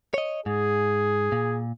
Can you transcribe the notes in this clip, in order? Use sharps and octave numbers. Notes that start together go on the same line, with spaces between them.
C#5 D#5
G#2 G#4
A#2